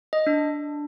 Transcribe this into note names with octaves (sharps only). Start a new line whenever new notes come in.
D#5
D4